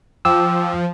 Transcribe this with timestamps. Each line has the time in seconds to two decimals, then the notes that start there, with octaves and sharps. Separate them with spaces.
0.25 F3 G5 D6 E6